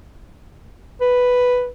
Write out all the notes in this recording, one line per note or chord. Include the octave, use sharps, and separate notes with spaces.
B4